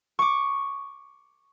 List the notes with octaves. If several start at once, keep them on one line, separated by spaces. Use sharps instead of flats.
C#6 D6